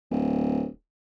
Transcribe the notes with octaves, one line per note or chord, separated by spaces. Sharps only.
D1